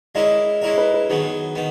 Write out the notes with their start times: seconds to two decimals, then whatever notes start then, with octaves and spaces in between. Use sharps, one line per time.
0.15 G#3 C#4 E4 A#4 D#5
0.62 G#3 C#4 E4 A#4 D#5
0.78 B4
0.94 B4
1.10 D#3 F#3 B3 G#4
1.55 D#3 B3